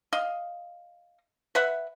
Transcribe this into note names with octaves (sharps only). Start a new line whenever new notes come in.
D#5 F5
B4 E5 F#5